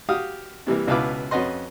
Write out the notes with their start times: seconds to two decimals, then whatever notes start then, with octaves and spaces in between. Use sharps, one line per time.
0.09 F#4 G4 F5 D#6
0.67 C3 E3 G3 A#3
0.87 C#2 B2 E4 B4 F5 D6
1.31 F2 C#4 F#4 B4 D#5 C6